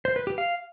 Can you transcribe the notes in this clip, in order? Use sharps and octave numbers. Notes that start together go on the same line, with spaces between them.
C5
B4
G4
F5